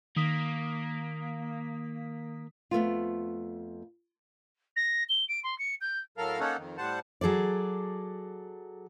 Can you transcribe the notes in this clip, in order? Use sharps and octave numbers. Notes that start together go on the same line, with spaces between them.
D#3 A#3 D#6 B6
F2 A3 B3 F4
A#6
G7
D7
C6
C#7
G6
A2 F#3 A4 A#4 F5 F6
A#3 C#4 D#4 A4 C#5 F#5
F2 D#3
A2 G3 C5 F#5 A5
F#3 G#4 A4 D5